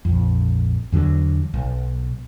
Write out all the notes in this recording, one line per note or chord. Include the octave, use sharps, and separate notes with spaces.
A#1 F2
E2 D3 F#3
B1